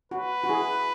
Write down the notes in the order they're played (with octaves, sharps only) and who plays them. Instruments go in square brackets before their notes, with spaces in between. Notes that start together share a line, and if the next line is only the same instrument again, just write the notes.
[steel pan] F#4 [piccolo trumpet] B4
[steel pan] F#4
E4 G#4